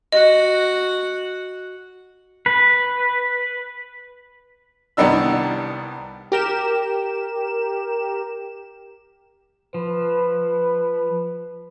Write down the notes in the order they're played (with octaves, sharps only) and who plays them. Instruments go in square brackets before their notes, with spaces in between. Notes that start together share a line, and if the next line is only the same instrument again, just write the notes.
[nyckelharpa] F#4 F#5 [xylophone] D#5
[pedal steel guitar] B4
[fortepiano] C2 D#3 G3 B3 D4 E6
[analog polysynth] G4 A#4 E7
[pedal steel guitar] F3 [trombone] B4